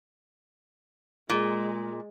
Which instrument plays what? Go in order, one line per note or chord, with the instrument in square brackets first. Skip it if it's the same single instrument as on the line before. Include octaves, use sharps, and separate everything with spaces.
[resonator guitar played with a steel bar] A#2 [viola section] G#3